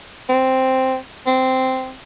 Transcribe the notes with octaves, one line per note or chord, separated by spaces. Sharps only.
C4
C4